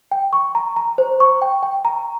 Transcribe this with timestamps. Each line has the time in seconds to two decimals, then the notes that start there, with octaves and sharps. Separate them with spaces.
0.11 G5
0.33 C#6
0.55 A#5
0.76 A#5
0.98 C5
1.20 C#6
1.42 G5
1.63 G5
1.85 A#5